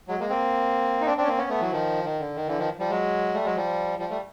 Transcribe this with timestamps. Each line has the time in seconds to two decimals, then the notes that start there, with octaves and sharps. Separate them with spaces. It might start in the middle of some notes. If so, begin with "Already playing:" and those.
0.08 F#3 G#3
0.19 G#3 A#3
0.30 A#3 C4
1.01 D#4
1.06 C4 D4
1.17 C4 D4
1.23 C#4
1.27 A#3 C4
1.38 B3 C#4
1.50 A3 B3
1.60 E3 F#3
1.71 D#3 F3
2.04 D#3
2.19 D3
2.36 D#3
2.47 D3 E3
2.58 D#3 F3
2.80 F3 G3
2.90 F#3 G#3
3.34 G3 A3
3.45 F#3 G#3
3.56 F3 G3
3.99 F3 G3
4.10 G3 A3